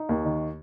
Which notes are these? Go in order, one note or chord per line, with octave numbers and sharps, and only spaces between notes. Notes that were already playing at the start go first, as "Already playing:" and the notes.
Already playing: D#4
D#2
D#3